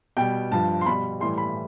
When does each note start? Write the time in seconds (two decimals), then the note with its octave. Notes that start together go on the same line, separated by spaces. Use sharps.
0.17 B2 G3 G5
0.51 G2 F3 A5
0.81 C6
0.86 B2 G3 B5
1.20 A2 E3 G3 C6
1.38 B5